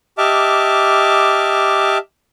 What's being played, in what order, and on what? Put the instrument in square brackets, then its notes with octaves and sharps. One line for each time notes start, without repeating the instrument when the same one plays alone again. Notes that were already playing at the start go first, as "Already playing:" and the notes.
[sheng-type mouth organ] G4 D#5 E5 A5 D6 F6